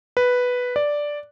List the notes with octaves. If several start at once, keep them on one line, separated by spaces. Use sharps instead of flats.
B4
D5